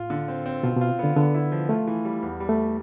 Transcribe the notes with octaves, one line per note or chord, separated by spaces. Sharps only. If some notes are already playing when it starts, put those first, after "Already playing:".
Already playing: A2 F4
D3
C4
C4
B2 F4
B2 F4
D3 B3
D3 B3
E4
F3
A3 F4
E3
G3
E2
G3
A3